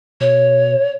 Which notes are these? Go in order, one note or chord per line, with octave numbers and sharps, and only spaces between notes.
B2 C#5